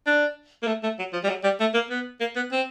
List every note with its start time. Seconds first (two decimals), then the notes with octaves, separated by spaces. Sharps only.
0.07 D4
0.63 A#3
0.67 A3
0.83 A3
0.99 F#3
1.13 F3
1.24 G3
1.29 F#3
1.44 G3
1.60 A3
1.74 A#3
1.90 B3
2.20 A#3
2.36 B3
2.52 C4